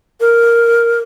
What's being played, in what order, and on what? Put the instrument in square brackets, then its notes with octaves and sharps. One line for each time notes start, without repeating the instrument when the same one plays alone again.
[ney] A#4